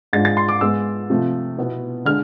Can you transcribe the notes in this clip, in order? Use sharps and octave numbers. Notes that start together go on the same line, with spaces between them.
G#2 G#3 D4 F4 A6
A6
C6
D6
G#2 G#3 B3 E6
C3 F3 A3
B2 B3 E4
D3 G#3 D4 F6